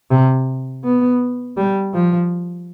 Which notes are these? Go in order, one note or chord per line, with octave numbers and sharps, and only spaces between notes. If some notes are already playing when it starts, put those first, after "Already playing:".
C3
B3
G3
F3